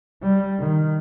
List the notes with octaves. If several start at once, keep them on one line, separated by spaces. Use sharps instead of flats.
G3
D#3